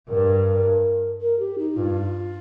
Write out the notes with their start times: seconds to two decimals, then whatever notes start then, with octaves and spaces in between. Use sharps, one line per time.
0.09 G2 A#4
1.21 A#4
1.39 G4
1.58 D#4
1.76 G2 F4